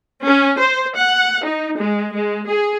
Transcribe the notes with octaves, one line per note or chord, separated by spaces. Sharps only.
C#4
C5
F#5
D#4
G#3
G#3
G#4